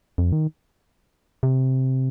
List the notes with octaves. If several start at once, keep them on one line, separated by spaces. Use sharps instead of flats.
F2
D#3
C3